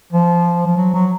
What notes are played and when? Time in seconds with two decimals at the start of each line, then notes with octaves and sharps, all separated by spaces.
0.12 F3
0.66 F3
0.77 F#3
0.94 F#3